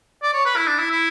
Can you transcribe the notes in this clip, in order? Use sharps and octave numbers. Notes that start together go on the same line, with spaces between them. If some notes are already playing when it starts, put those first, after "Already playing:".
D5
C#5
B4
E4
D4
E4
E4